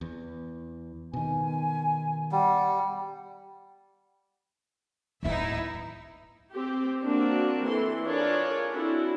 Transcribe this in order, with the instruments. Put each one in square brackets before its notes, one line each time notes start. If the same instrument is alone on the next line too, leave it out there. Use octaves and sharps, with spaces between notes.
[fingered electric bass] E2
[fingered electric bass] B2 D#3 [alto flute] G#5
[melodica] G3 [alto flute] F#5
[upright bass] D1 B3 [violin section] D#4 E4 E5
[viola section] C4 G4
A#3 C4 D4 F#4
E3 A4 C6
D4 F4 G#4 A#4 C#5 D5
C4 D4 E4 F#4 A4